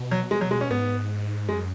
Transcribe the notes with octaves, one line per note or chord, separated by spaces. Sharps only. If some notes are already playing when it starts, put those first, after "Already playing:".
Already playing: B2
F#3
G#3
F#3
G#3
C#4
G#2 B3
F#2 G#3